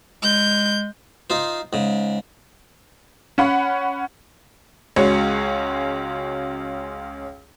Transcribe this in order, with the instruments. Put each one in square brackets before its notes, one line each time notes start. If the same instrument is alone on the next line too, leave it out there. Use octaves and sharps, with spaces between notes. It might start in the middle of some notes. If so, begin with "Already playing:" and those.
[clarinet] G#3 [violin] G6
[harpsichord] D#4 F4 C5
G#2 C#3
[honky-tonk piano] C#4 F#5 B5
C#2 G#3 C#4 F#4 C#5 C#7